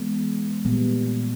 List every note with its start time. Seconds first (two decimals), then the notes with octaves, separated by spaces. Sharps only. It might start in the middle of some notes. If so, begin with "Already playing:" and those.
Already playing: E3 G#3 B3
0.65 A#2 G3 B3